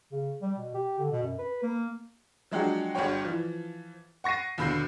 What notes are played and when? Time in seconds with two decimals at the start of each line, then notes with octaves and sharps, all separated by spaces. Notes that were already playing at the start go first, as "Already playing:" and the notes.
0.12 C#3
0.42 G3
0.57 B2
0.74 G4
0.99 D3
1.12 B2
1.23 F#2
1.39 B4
1.63 A#3
2.51 F3 F#3 G#3 D4 F#4 G4
2.95 G1 G2 F#4 G#4 C#5 G5
3.25 E3 F3
4.24 F#5 C#6 A#6 C7 D#7
4.58 D#2 B2 D3 B5 G6 C7